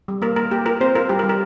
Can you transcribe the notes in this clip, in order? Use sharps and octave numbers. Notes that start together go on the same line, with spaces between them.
G3
A#3 A#4
A#3 A#4
A#3 G4
F4 A#4
C4 C5
F4 A#4
G3 G4
A#4
G3
A#4